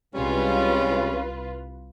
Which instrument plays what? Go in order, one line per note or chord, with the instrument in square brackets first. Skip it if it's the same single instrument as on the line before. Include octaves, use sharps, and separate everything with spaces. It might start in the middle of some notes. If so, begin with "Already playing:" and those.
[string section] C2 F4 B4 [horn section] G3 G#3 C#4